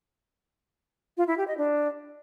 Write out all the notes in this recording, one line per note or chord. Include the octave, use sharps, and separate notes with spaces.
F4
E4
G4
D#5
D4